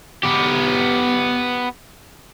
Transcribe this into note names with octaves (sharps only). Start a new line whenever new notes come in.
B3 G4